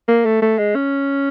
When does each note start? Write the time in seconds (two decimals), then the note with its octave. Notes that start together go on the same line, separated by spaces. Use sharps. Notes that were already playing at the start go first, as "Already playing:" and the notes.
0.08 A#3
0.25 A3
0.42 A3
0.59 G#3
0.75 C#4